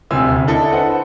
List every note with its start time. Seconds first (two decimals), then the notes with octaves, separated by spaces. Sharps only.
0.11 D#1 D2 C3 G#5 E6
0.47 D4 E4 A4 D#5
0.72 A4 B4 C5 F#5